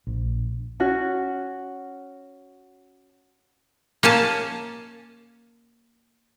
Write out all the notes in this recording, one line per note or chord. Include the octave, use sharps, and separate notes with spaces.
A#1
C#4 F#4
A#3 C#4 G#5 A5